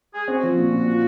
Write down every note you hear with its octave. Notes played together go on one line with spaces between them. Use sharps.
G#4
C4 F#4
F3
A#2
A#2
F4